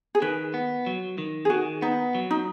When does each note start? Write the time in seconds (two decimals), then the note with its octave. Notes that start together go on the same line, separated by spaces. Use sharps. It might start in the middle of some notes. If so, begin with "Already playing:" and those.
0.15 G#4
0.22 D#3 B4
0.54 B3
0.86 F#3
1.18 D#3
1.45 G#4
1.50 D#3 F#4
1.82 B3 D#4
2.15 F#3
2.31 D#4